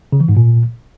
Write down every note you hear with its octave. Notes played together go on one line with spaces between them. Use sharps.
C#3
E3
G#2
A#2